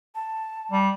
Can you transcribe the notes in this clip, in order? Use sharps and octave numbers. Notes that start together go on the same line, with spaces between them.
A5
G3